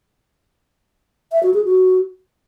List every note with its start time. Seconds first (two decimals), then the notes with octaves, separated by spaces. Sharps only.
1.32 E5
1.43 F#4
1.54 G#4
1.65 F#4